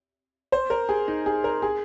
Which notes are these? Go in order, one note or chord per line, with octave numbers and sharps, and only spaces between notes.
C5
A#4
G#4
D#4
G#4
A#4
G#4